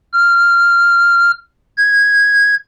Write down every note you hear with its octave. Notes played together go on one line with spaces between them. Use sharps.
F6
G#6